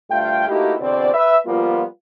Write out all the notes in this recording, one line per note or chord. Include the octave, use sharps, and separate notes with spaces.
D2 G2 A3 F4 F5 G5
A3 A#3 D#4 E4 F#4 G4
E2 B2 D3 C4 C5 D5
B4 E5
F3 G3 A#3 B3 F4